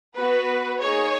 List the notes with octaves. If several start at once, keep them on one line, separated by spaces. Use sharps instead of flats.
B3 F#4 B4
A#3 D#4 G#4 C#5